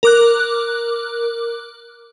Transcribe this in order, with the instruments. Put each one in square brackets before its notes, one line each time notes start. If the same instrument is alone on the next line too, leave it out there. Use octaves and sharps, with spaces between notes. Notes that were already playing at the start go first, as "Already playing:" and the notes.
[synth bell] A#4 D6 F#6